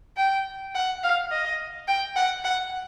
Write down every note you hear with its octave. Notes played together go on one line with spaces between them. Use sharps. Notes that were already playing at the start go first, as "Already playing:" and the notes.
G5
F#5
F5
D#5
G5
F#5
F#5